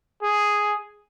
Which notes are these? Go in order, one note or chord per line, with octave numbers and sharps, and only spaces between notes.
G#4